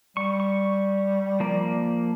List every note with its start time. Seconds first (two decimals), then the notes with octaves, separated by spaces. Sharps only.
0.17 G3 C#6
0.40 C#6
1.40 F3 A#3 D5